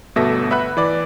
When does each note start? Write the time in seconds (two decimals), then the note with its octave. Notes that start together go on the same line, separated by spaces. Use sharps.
0.16 G1 B2 A3 A4 E5 A#6
0.50 B4 E5 F#5 B5 F#6
0.77 E3 D5 D6